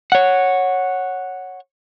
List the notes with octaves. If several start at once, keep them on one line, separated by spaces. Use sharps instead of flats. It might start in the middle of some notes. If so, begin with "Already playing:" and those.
C#5 F#5